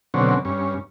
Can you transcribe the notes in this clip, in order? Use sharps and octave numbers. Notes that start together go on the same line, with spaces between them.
B2 D3 F#3 C4 C#4
G2 C#4